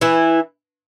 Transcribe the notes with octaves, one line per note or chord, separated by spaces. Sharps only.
E3 E4